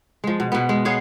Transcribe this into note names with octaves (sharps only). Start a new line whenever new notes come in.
F3 G#3
B2
B2 B3
G#3
B3 G#4 C#5 F5